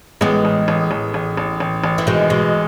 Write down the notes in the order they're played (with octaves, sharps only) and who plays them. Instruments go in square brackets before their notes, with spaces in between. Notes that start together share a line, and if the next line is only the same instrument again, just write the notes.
[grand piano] A1 [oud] G#3 B3
[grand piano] A1
A1
A1
A1
A1
A1
A1
[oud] E3
[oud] B2 D#3 [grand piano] G#3
[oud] B2 [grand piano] G#3